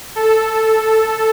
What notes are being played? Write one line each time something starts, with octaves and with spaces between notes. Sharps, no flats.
A4